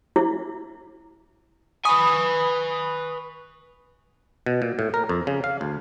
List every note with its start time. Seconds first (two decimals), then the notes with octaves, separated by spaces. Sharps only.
0.16 E4
1.85 B4 G#5 B5 C#6 D#6
4.46 B2
4.62 A#2
4.79 A2
4.94 A#4
5.09 F2
5.27 C#3
5.44 F5
5.61 D2